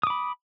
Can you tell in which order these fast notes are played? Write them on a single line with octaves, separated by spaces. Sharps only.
D#6 D6 B5